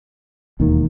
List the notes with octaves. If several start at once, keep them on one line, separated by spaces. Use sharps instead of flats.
E1 D#2 D#3